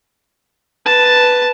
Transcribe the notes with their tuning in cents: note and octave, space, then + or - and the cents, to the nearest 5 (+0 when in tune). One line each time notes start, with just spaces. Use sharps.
B4 +0 A5 +0